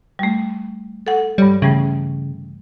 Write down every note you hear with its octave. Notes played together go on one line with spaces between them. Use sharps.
G3 A3
A4 F#5
G2 G3 C#5
C#3 E3 G3 A3